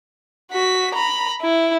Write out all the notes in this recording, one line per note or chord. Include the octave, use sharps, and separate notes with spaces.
F#4 B6
A#5 B5
E4